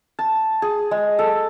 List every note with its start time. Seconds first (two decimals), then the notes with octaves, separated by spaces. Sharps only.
0.19 A5
0.62 G#4
0.91 G#3
1.19 A4